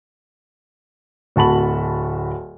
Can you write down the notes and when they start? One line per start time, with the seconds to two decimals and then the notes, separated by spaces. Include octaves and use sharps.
1.36 D1 F#4 A5 B5 F#7